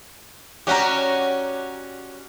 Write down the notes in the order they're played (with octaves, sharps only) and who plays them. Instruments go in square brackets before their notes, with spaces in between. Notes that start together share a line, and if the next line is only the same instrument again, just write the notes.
[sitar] C#4 F#4 G4 [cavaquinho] D5 F#5 A#5